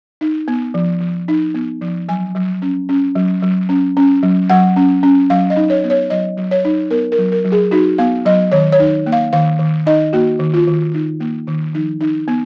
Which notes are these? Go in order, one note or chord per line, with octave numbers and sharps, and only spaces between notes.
D#4
B3
F3
F3
D#4
B3
F3
F#3 G#5
F#3
C#4
C#4
F#3
F#3
C#4
C#4
F#3
F#3 F#5
C#4
C#4
F#3 F5
D#5
D#4
C#5
B3
C#5
F#3 D#5
F#3
C#5
D#4
B3 A#4
A#4
F#3
A#4
F#3
G#4
D#4 F#4
B3 F5
F#3 D#5
D#3 C#5
C#5
D#4
A#3
F5
D#3 F5
D#3
D#4 D#5
A#3 F#4
D#3
F4
D#3
D#4
A#3
D#3
F3 D#4
D#4
B3